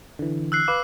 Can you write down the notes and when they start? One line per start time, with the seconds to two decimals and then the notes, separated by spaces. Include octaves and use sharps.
0.19 D3 E3
0.52 E6 F#6 C7
0.68 B4 F5 D6